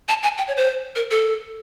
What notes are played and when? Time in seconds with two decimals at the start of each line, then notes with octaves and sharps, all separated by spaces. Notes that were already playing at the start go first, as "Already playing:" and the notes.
0.09 A5
0.23 G#5
0.38 G5
0.48 C#5
0.57 C5
0.96 A#4
1.11 A4